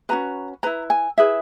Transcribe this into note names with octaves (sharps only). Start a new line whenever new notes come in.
C#4 F#4 B4 A#5
E4 B4 A#5
G#5
E4 G#4 B4 E5